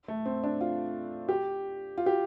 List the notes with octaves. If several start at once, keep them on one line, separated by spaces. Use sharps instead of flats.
A3
C4
D4
F4
G4
F4
G4